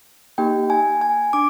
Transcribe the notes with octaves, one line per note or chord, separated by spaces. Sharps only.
A#3 D#4 G4 G5
G#5
G#5
D4 D6